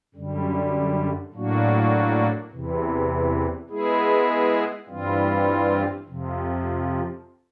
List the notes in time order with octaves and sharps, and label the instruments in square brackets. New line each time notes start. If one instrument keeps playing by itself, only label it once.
[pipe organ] F#2 D3 G3
A2 F#3 A#3 D4 F#4
E2 C3 E3
G#3 B3 E4 G#4
G2 E3 G3 C4 F4
F2 C3 F3